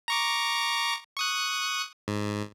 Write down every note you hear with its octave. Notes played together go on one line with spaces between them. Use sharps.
A#5 C#6 D6
C#6 D#6 F#6
G#2